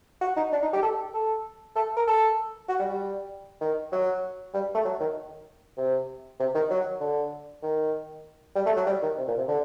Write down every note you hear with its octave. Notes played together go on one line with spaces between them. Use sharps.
F#4
D#4
D4
D#4
G4
A4
A4
A4
A#4
A4
F#4
G3
G3
D#3
F#3
G3
A3
F#3
D#3
C3
C3
D#3
F#3
D3
D#3
G3
A3
F#3
G3
D#3
C3
A#2
C3
D3